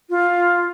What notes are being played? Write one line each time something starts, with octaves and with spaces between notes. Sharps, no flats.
F4